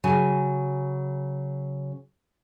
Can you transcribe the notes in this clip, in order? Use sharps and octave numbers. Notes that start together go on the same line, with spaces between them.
C#3 F#3 G#5